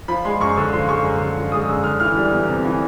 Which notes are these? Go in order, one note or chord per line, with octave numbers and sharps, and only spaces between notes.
F3 B5
G#3 C6
F#2 C#6
D3 C#6
F3 C6
G#3 C#6
F#2
D3
F3
G#3 D#6
F#2 E6
D3 F6
E3 F6
G3
F6
E2
C3
E3